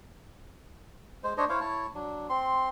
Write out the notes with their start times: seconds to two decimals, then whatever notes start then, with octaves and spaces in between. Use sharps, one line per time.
1.23 G#3 C5
1.37 D4 C5 C#5 D#5
1.49 E4 C5 C#5 F5
1.61 E4 C#5 A5
1.95 F#3 D4
2.29 C4 C6